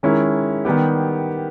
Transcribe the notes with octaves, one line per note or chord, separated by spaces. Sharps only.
D#3 G#3 C#4 E4 A#4
D#3 G3 B3 G4